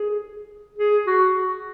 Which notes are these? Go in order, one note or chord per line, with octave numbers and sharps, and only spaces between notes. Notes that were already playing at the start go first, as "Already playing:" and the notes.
Already playing: G#4
G#4
F#4